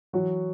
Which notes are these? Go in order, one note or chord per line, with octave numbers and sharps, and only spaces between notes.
E3 F#3 F#4